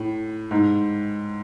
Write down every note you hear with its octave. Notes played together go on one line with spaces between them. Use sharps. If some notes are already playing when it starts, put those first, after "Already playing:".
Already playing: A2
G#2